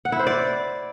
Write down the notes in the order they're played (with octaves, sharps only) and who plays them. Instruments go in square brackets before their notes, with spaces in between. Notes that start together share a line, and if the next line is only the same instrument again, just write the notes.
[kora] F#5
E4
C5
D5